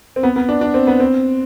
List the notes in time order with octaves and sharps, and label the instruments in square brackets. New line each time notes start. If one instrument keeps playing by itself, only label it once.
[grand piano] C4
B3
B3
D4
D4
C4
B3
C4